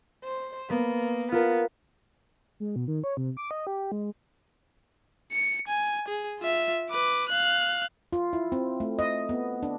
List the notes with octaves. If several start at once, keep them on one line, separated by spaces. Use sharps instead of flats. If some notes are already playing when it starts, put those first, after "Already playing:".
C5
A#3 B3
B3 F4 A#4
G#3
B2
D#3
C#5
C3
D6
D#5
G4
G#3
C#7
G#5
G#4
F4 E5
B4 D6
F5 F#6
F4
E4
C4
A3
D#5
B3
D4